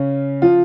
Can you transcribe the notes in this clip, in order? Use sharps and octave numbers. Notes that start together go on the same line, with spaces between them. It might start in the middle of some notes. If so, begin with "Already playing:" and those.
Already playing: C#3 C#4
F3 F4